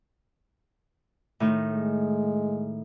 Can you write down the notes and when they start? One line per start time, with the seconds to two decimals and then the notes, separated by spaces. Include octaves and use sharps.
1.40 A2 D#3
1.73 G#3